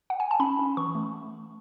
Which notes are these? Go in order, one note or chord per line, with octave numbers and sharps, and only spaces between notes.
F#5
G#5
A5
C#4 B5
C#4
E3 C#6
A3